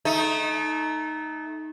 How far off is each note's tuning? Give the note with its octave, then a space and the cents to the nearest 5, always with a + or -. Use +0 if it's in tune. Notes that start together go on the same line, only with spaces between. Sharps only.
A3 -25 D#4 +0